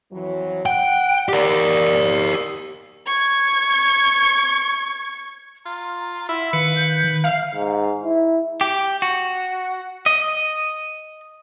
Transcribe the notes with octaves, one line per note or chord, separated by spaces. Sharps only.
F2 E3 F#3
F#5 G5
G4 A#4 D5
C#6 G#6
F4 A#5
E4 F#5
D#3 B4 F5 C#7
G6
D#3
E5 F5
G#2
E4
G4
F#4
D#5